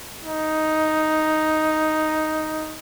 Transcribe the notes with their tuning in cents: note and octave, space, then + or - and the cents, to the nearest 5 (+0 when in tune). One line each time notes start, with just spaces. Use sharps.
D#4 +5